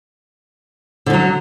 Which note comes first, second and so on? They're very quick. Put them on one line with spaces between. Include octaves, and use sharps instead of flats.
D3 F3 F#3